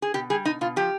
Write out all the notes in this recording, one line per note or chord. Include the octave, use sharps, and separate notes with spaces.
G#4
B2 G4
G3 G#4
B2 D#4
B2 F4
F3 G4